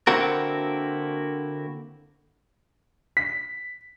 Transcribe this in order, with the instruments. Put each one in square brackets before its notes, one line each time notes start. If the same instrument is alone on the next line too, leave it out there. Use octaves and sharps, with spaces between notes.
[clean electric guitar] D3 A#3 C4 E4 F#4 A#4
[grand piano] B6